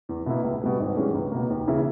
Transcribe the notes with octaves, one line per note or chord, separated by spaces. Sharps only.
E2
B2 A#3 E4
C#2
B2 G3 B3
G#1
G2 E3 G#3 C#4
C#2
B2 A#3
D#2
C#3 E3 A#3 E4